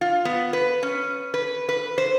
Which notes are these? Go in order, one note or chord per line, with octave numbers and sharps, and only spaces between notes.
F4
B3
B4
C#4
B4
B4
C5